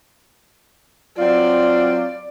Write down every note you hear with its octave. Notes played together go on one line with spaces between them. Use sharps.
F#3 C4 F4 D5